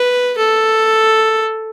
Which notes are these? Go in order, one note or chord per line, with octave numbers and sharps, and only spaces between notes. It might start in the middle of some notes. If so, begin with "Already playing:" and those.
Already playing: B4
A4